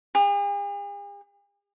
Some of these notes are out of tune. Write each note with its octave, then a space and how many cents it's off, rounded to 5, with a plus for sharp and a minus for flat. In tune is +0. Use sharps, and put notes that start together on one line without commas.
G#4 -45